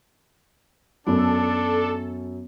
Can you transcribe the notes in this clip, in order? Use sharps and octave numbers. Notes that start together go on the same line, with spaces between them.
F#2 B3 D4 A4